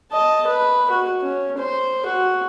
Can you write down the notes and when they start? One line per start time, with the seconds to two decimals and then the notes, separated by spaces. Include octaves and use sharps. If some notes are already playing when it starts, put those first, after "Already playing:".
0.12 D#5 A5
0.47 B4
0.91 F#4
1.22 C#4
1.58 C5
2.06 F#4